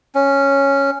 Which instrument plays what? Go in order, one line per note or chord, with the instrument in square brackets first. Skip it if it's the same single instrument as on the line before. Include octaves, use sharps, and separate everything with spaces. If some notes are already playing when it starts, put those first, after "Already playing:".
[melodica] C#4